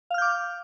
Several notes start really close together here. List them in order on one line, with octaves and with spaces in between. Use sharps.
F5 F6 G6 D6